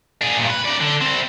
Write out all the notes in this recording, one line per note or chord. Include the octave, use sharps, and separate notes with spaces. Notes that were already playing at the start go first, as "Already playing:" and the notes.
D4 G#4
G2 A#2
B4
D#4 D5
D3
G3 C4